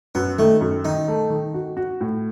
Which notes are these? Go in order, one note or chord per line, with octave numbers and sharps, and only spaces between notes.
F#2 B3
D#3 A3
F#2
D#3 D#4
A3
D#3
F#4
F#4
A2